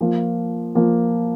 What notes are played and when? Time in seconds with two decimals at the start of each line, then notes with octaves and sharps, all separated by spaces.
0.01 F3 A#3 F4
0.75 F3 A#3 F4